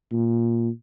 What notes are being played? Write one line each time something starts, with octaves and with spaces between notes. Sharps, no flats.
A#2